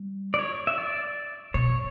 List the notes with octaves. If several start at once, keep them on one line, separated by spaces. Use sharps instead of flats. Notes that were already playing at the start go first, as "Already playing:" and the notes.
Already playing: G3
D5
C#5
E5
D5
B2 C#5